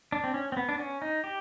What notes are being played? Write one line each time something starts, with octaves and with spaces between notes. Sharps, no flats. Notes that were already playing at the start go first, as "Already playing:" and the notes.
D4
C4
C#4
C4
B3
D4
C#4
D#4
G4